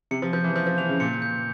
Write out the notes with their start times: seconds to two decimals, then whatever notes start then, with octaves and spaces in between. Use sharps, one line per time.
0.11 C3 C#7
0.22 F3
0.33 F3 G6
0.44 E3
0.56 F3 G6
0.67 F3
0.78 E3 F7
0.89 C#3
1.00 A#2 C#7
1.22 G6